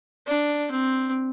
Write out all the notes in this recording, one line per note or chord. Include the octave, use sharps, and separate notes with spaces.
D4
C4